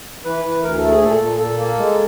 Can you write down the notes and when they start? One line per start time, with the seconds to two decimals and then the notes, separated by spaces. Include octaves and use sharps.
0.25 E3 B4
0.44 E3
0.63 D2 A#4
0.77 A4
0.83 A3
0.90 G#4
1.01 A#2 A4
1.21 A#2
1.39 A#2 A4
1.59 A#3
1.78 G#3